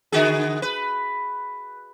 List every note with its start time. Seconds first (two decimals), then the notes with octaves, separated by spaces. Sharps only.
0.12 D3 F#4 G#4
0.62 B4